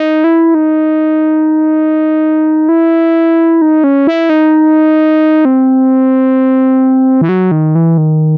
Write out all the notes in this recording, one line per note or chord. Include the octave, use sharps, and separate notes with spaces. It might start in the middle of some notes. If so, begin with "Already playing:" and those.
Already playing: D#4
E4
D#4
E4
D#4
C#4
E4
D#4
C4
E3
F#3
D#3
E3
D#3